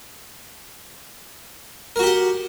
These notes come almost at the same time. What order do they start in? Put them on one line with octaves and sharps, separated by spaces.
A#4 F#4 G4 F#5